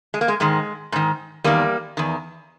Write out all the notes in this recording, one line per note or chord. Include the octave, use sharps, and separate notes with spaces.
G#3
A#3
G#3
G#2 D#3 G#3
G#2 D#3
E2 D#3 G3 A#3
E2 D#3